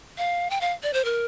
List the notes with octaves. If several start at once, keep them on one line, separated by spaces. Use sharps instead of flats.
F5
G5
F5
D5
C5
A#4